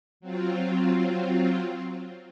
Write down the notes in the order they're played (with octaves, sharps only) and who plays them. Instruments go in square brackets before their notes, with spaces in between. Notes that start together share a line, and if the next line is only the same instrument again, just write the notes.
[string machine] F#3 C4 F4